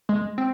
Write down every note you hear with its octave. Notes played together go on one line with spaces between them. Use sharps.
G#3
C4